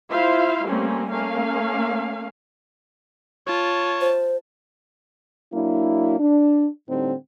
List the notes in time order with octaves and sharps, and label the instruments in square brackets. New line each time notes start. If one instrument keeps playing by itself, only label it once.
[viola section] E4 F4 C5 E5 F5
G3 A3 A#3 C4 C#4
A3 A#3 C#4 F5
[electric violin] F4 A5 [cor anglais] C#5
[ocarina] C5
[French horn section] F#3 A#3 D4 E4
D4
A2 D3 G3 C4 D#4